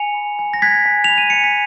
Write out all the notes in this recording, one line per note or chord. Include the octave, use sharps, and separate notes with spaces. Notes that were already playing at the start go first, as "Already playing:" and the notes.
Already playing: G#5 C#7 F7
B5
G#5
A#6
F#6 G#6 B6
G#5
B5 F7
D#7
G#5 C#7
B6